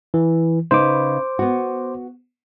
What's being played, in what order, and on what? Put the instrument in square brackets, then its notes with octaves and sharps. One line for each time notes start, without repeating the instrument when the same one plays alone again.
[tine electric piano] E3
[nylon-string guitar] C#3 D#4 B4 [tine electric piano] C5 D6
[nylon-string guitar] B3 F#4